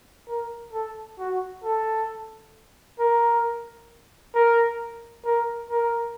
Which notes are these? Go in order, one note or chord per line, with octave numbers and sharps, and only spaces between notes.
A#4
A4
F#4
A4
A#4
A#4
A#4
A#4